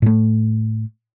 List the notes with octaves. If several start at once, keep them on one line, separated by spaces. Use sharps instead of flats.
A2 A3